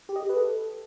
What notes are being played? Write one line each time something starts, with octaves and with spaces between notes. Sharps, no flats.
G4
D#5
G4
B4
A4